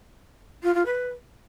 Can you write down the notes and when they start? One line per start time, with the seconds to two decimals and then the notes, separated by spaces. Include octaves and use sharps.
0.63 F4
0.74 F4
0.85 B4